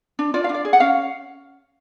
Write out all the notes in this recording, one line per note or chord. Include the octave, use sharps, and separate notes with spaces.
D4
F4 D5
F5
D4
D5
G#4
F#5
C#4 F5